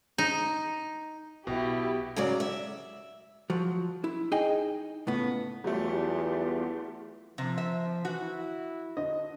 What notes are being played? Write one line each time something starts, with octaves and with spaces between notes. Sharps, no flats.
D#4
B1 B2 E4 G4
G#2 C#3 F#3 D5
E5
F3 F#3
E4
D#4 G#4 D#5 G5 G#5
C#2 A2 B3
E2 F#3 G3 A3 B3 F4 G4
C3 F3
E5
E3 F#4
E4
D3 D#5